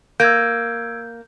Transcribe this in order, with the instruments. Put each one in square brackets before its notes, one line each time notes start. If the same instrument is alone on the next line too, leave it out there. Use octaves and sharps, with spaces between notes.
[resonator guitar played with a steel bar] A#3 [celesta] E6 G#6 D7 [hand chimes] G6